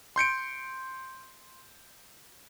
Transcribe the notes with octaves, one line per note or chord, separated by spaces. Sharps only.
C6 G6 C#7 D7